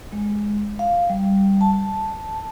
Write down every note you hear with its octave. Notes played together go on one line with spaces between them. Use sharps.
G#3
F5
G3
A5